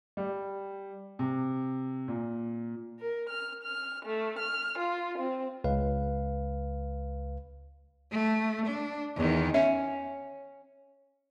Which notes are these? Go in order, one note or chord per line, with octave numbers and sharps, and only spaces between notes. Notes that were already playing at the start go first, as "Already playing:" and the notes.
G3
C3
A#2
A#4
F6
F6
A3
F6
F4
C4
C#2 B4 F5
A3
D4
E2 D#3
C#4 E5